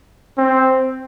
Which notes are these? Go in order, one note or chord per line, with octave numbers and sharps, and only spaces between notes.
C4